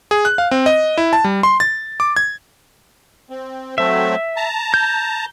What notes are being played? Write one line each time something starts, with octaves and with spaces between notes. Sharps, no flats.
G#4
F#6
F5
C4
D#5
E4
A5
G3
C6
A6
D6
G#6
C4
F#3 A3 C4 E5
A5 A#5
G6